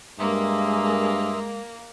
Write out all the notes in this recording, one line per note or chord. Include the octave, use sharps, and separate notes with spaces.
G2 G#3 A#3 E5 C6 D#6